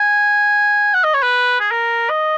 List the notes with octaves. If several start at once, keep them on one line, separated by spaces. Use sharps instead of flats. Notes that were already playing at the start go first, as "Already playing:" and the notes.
Already playing: G#5
F#5
D#5
C#5
B4
G#4
A#4
D#5